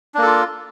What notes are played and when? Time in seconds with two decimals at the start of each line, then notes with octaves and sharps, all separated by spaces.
0.14 D4
0.18 A#3
0.22 A4
0.26 F4